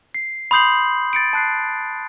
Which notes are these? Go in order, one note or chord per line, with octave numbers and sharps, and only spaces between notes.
C7
B5 C6 D#6 G6 C7 F#7
A6 C#7 D7
A5 F#6 C7